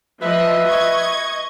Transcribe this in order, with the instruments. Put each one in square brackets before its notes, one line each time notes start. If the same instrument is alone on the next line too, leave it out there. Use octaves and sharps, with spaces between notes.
[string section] F3 D#5 [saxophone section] B4 E5
[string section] D#5 C#6 G#6